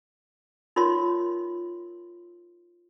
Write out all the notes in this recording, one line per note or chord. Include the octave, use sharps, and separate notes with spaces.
D#4 F4 A#4 C#5 C6